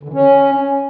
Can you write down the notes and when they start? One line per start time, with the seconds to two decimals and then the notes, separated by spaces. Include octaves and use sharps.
0.03 D3
0.08 E3
0.13 C#4